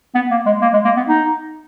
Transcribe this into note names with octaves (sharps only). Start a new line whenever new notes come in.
B3
A#3
G#3
A#3
G#3
A#3
B3
D#4